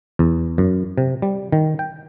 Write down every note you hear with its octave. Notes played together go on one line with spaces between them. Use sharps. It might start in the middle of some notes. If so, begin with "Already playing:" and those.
E2
F#2
C3
G3
D#3
G5